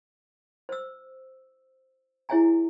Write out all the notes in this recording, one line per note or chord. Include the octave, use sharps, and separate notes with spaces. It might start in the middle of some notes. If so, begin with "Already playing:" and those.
C5 E6
E4 G#4 C#5 E5 G#5 A#5